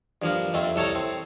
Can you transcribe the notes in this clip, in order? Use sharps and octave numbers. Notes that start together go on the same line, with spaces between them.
G2 F3 A#3
F2 A3 C4
C2 A4 C#5 A5 A#5
C4